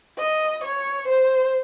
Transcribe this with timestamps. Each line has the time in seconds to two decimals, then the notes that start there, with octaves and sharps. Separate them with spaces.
0.18 D#5
0.64 C#5
1.08 C5